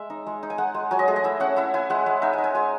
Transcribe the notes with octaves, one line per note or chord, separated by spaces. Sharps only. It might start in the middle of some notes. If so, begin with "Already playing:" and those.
Already playing: G#3 E5
D#4
G#3
D#4
G#5
G#3 F#5
G#3
F#3 G#5
D#5
A3 G#4
D#5
E4 E5
C#4 F#5
E4 E5
E4 G#5
G#3 F#5
G#3
D#4 E5
D#4 G#5
G#5
G#3 G#5